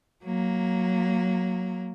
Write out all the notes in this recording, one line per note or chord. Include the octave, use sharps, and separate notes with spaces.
F#3 A#3